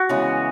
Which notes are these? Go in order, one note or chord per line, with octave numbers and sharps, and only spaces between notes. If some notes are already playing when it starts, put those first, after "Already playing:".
Already playing: F#4
C#3 E3 G#3 B3